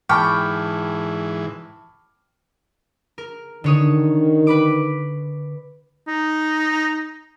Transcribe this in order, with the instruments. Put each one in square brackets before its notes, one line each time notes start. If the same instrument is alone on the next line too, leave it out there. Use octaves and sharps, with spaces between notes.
[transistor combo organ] G#2 E3 [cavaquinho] G5 [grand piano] A5 B5 C#6 [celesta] D6 F6
[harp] A#4
[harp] D3 C#5 D#6 [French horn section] D#3
[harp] B4 B5 D6
[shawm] D#4